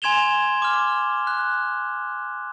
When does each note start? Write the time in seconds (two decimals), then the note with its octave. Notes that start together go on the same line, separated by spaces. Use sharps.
0.02 G#5 C6 G#6 E7 F7 G7
0.62 D6 F6
1.27 F#6